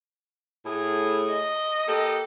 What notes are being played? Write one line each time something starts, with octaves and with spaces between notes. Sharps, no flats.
A2 G#4
D#5
A#3 G4 A4